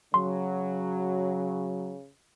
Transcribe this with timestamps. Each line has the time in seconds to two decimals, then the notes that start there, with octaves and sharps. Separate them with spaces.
0.14 C#3 F#3 C6